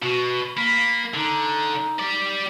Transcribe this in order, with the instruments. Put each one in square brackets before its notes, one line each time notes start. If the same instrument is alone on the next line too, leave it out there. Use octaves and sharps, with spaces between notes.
[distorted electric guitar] B2 [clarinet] F#4
[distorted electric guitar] A#3 [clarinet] B5
[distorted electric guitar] D3 [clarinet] D#4
[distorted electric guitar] G4 D5